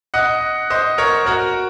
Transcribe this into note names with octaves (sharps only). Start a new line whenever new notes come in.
D#5 F#5
C5 D#5
A#4 C#5
F#4 A#4